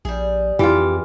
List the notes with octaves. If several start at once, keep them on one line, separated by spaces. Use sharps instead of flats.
A#1 G3 G#4
F2 E3 F4 G4